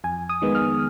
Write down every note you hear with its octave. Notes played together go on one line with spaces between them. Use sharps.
F2 G#5
D#6
D#3 G#3 B3
F6